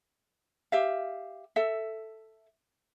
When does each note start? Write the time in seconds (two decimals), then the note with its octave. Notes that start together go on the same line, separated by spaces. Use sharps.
0.72 G4 E5 F5
1.56 A4 E5